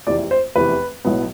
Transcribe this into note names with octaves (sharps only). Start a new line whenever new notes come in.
F1 E2 C3 E3 D5
C5
F1 E2 C3 E3 B4
B1 A2 F#3 B3